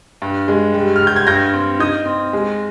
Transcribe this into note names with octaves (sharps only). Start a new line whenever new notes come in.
G2
G#3
G3
F6
G3
G6
G#6
G2 G6 A#6
C4
D#4 D#6 G6
C4
G#3